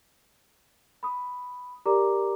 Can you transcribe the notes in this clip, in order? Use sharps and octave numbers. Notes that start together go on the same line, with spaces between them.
B5 D#6
G4 A#4 D5 A#5 D6